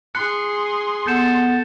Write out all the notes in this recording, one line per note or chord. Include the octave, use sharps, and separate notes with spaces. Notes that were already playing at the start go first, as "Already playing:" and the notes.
G#4 C6 F#6 C#7
B3 A4 G6 C#7 E7